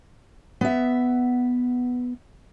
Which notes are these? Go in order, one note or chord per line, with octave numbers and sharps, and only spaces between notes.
B3 E5